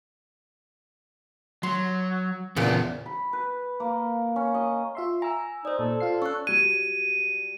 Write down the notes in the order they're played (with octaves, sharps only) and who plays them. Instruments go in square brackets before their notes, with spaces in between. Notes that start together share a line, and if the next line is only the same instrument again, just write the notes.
[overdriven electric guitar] F#3 [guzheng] C6
[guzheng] E2 A#2 C#3 [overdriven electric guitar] B3 D4
[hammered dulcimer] B5
B4
A#3
C#4
D#5
[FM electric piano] F4 E5 C6
[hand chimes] G#5 [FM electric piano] A#5 E6
[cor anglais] D#4 [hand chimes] C5 D5
[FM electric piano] A#2 [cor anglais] A4
[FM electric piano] F4 F5 C7
[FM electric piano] C#4 [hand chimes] C#6 F#6
[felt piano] F#3 G3 G#6 [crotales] D#7